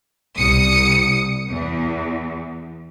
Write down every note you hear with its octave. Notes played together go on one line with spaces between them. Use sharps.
C2 D#6 C#7
E2